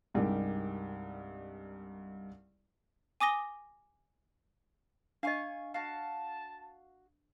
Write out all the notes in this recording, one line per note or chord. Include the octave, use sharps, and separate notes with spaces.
C2 G2 G#3 D#4 G4 A#4
G#5 D6 D#6 A#6 G7
D4 D#5 F5 G#5 C#6
F#4 F5 A5